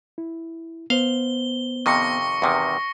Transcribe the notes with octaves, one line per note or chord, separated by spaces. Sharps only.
E4
B3 C5 F5 G7
F2 C3 D#3 C#6 A#6 C#7
E2 C3 D#3